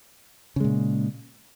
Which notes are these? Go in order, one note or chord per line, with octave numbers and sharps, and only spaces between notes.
A#2 C#3 G#3